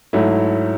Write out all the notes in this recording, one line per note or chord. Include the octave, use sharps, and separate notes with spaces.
G#2 F#3 A3 E4